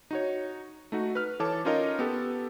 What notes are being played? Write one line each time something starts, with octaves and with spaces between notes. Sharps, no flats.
D#4 F#4 C#5
A3 D#4 F#4
B4 F6
E3 A4 C#5 A5 D6
C#4 D#4 F4 A#4 C#5 D#5
B3 G4 A4